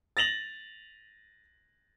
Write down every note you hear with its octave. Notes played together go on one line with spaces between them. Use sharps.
A6 A#6 F7 F#7